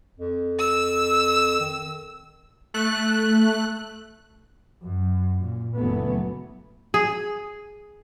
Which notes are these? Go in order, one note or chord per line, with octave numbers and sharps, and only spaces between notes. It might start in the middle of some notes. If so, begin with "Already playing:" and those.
F2
E6
D#3
A3 F#6
F#2
A#2
F#1 E3 F#3 A3 B3
G#4